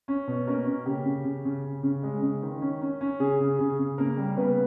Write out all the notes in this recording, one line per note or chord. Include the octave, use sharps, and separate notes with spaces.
C#4
B2
A#3 C#4 A#4
C#4
C#3 G4
C#3
C#3
C#3
C#3
C#3
G#3
C#3
D#3
C#4
C#4
C#4
C#3 G#4
C#3
C#3 G#4
C#3
C#3 A#3 A#4
G3
C#3 B3 B4